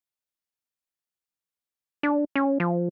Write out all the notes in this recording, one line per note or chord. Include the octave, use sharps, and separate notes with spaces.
D4
C#4
F3